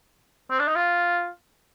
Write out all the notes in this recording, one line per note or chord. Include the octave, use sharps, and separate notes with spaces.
C4
D4
D#4
F4